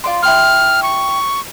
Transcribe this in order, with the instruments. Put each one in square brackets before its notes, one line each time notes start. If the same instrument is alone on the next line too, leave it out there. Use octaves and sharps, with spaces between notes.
[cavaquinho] F4 D5 C6
[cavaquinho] E4 G4 C6 [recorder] F6
[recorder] C#6